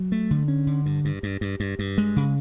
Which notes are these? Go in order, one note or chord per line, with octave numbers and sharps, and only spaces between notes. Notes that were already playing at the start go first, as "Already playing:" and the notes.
Already playing: F#3
A3
D3
C#4
D3
G2
G2
G2
G2
G2
G2
G#3
C#3